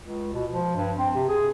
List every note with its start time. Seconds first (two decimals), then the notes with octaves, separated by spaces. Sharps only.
0.04 C#2
0.34 B2
0.50 F3
0.76 G2
0.98 C4
1.15 C3
1.29 G#4